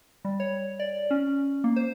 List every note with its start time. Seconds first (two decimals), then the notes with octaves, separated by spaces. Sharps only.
0.25 G3
0.40 C#5
0.79 D5
1.11 C#4
1.64 A#3
1.76 C5